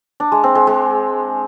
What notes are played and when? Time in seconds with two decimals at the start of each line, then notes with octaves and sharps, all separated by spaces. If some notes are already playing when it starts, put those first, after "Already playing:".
0.20 D4
0.32 G#3
0.44 C4
0.55 G#3
0.67 G#3